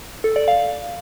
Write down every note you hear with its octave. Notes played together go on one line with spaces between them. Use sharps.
A4
D5
F5